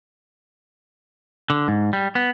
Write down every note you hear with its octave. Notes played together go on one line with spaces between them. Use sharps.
D3
G#2
G3
B3